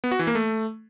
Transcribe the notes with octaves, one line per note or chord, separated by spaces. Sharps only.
B3
F#4
E3
A#3
A3